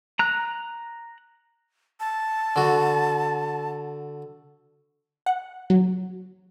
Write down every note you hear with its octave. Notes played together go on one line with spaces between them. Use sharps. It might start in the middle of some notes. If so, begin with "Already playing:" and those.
A#5 F#6
A5
D3 F#4
F#5
F#3